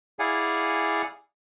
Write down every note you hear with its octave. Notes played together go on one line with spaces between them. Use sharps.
E4 G#4 D5 F5 F#5 G#5